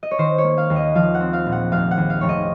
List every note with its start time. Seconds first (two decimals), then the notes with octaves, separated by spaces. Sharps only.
0.03 D#5
0.11 C#5
0.18 D#3 C5
0.38 C#5
0.44 A#3
0.58 F5
0.70 D#2
0.76 D#5
0.95 F3 F5
1.15 F#5
1.20 C4
1.33 F5
1.46 A#1
1.52 F#5
1.71 F1 F5
1.91 F#5
1.97 D#2
2.10 F5
2.21 F1 C#5
2.29 D#5